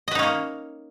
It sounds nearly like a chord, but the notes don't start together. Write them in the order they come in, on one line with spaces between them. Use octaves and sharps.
D#5 B4 D#4 C#4 A#3